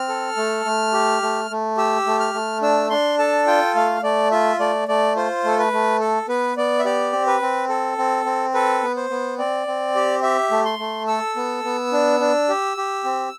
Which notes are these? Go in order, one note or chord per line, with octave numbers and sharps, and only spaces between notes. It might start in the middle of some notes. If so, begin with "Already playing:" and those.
Already playing: C4 F6
A4
A3
A3
G4
A3
A3
G4 E6
A3
F6
A3
D4 E6
D4 C6
A4 A5
F4 G5
A3 F5
A3 D5
F4 E5
A3 D5
A3 D5
F4 C5
A3 A4
B4
A3
A4
B3 B4
B3 D5
E5
G4 D5
C4
B4
C4
A4
C4
C4
A4 B4
B3
C5
B3
C4 D5
C4
G4
G4 E5
A3
C6
A3
A4 E6
B3
B3
D4
D4
G4
G4
C4